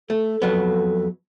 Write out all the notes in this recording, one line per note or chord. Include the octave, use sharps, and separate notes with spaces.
A3 A4
F2 F#3 B3